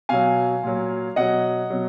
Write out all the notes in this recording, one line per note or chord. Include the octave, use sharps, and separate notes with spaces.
B2 F#3 F5 G#5
A#2 F#3
B2 F#3 D#5 F#5
B2 F#3